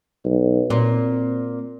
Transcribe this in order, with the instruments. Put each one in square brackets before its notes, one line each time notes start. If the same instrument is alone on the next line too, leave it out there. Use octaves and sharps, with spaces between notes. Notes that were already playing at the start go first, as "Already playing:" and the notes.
[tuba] B1
[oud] A#2 [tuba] C4